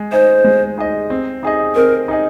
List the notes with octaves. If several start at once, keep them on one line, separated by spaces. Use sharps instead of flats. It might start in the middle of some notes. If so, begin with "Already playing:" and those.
Already playing: G#3
D#4 G#4 C5 D#5
G#3
D#4 G#4 D#5
C4
D#4 G#4 D#5
C4 A#4
D#4 G#4 D#5